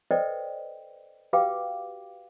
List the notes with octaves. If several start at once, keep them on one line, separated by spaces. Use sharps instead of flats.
A4 B4 C5 D5 D#5 G5
F#4 G4 B4 F5 G5 D6